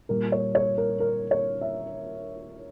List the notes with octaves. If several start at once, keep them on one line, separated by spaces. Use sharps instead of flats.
A#2 G3 A#4
C#5
C#5
A#4
A#4
C#5
E5